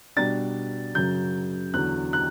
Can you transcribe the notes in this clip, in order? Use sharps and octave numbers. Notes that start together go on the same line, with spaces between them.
B2 G3 D4 A6
F#2 C#3 F#3 G6
E2 D3 F#3 F#6
F#6